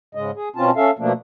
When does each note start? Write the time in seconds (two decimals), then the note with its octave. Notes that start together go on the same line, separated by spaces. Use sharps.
0.15 G#2 C#3 G#3 D#5
0.36 G#4
0.56 B2 C4 C#4 F4 A5
0.76 C#4 A4 E5 F5
0.99 B2 F3 A3 A#3 D4